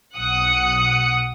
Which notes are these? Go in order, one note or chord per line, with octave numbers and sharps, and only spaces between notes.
B1 F#5 D#6 F#6 C#7